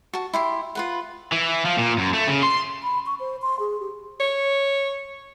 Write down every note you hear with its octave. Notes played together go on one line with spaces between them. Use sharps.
F#4 A5
E4 G4 C6
F4 B4 F#5
E3
F3
A#2
F#2
A3
C#3
C6
B5
C#6
C5
C6
G#4
G4
C#5